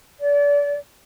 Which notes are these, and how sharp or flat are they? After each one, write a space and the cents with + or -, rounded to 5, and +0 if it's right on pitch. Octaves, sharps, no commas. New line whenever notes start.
D5 -35